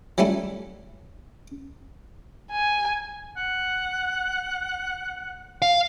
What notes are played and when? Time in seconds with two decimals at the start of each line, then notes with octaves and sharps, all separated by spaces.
0.18 F#3 G3 A3 C#4 E4
2.52 G#5
3.37 F#5
5.62 F5